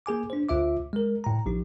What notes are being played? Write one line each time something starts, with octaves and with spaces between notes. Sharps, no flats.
A#3 G#4 G#5 D6
D4 C5
D2 F4 E5 D6
G#3 A#4
A2 A#5
A1 F3 D#4